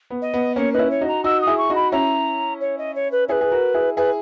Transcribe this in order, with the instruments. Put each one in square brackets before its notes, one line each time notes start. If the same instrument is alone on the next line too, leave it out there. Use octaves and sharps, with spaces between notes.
[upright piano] B3
[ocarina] D#5
[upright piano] B3
[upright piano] A#3 C#4 [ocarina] C#5
[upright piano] D#4 [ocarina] B4
[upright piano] C#4 E4
[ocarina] C#5
[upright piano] D#4 F#4
[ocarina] A#5
[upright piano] D#4 F#4 [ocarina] E6
[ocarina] D#6
[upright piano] E4 G#4
[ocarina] C#6
[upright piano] D#4 F#4
[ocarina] B5
[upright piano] C#4 E4 [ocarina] A#5
[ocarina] C#5
D#5
C#5
B4
[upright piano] E4 G#4 [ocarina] B4 C#5
[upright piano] G#4
F#4 A#4
E4 G#4
[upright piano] E4 G#4 [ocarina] B4